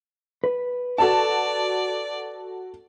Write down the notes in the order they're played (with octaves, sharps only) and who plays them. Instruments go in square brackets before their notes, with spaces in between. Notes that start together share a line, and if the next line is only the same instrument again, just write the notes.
[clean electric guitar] B4
[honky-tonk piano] F#4 A4 A5 [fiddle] D5